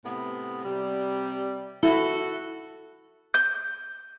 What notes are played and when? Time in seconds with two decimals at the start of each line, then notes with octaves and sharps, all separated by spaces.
0.05 A2 C3 B3
0.65 C3 G3
1.83 E4 F#4 A4
3.34 G6